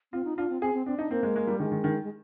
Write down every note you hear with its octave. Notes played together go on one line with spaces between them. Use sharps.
C4 F4
D#4
D4 F4
C4
C4 G#4
C4
C4 D4
D4 D#4
A#3 C4
G#3
G#3
G3
D#3 G#3
D#3
D#3
G#3